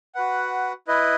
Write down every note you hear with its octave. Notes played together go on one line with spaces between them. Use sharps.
F#4 B4 F#5
E4 B4 D#5